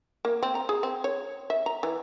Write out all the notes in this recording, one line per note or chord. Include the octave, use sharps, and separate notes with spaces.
A#3
C4
A#5
G#4
C4
C#5
E5
A#5
E3